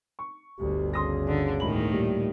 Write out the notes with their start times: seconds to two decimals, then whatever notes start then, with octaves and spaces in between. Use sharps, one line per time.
0.19 C#6
0.59 G1 D2 G4
0.93 C#3 C6 D#6 A#6
1.28 D3
1.60 E1 A2 D#3 B5 F#7
1.92 A#2 G3